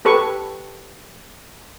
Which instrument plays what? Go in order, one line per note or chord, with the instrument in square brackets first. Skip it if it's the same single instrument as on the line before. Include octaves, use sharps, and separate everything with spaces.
[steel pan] G4 A4 B4 C#6